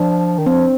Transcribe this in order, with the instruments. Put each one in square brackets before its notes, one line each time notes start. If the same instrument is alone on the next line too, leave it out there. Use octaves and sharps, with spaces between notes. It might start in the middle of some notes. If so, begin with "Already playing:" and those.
Already playing: [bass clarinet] F3 [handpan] D4
[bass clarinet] D#3
[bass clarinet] F3 [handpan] C4